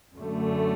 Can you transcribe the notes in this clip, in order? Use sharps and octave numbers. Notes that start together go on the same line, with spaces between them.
F#2 D3 A3